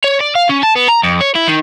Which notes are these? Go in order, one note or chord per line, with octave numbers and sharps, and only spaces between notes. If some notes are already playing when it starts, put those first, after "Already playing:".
C#5
D5
F5
C#4
A5
B3
A#5
F2
C#5
E4
D#3